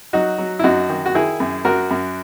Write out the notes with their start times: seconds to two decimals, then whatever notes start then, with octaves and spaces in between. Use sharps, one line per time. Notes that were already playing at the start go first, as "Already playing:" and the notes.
0.13 F#3 D#4 F#4
0.38 F#3
0.59 E4
0.64 F#2 D#4 F#4
0.90 D#3
1.06 F#4
1.15 D#3 E4 G#4
1.40 F#2
1.65 F#2 F#4 A#4
1.91 F#2